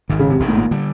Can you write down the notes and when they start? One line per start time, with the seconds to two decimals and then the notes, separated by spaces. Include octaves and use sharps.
0.09 G#1 G#2 D#3
0.19 C#3
0.30 C3
0.40 G#1 G#2 D#3
0.48 A2
0.56 A#2
0.71 D3 G3